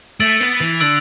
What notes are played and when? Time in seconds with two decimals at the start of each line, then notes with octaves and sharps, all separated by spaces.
0.20 A3 E6 A6 D7 F#7
0.40 B3
0.61 E3
0.80 D3 E6 A6 D7 F#7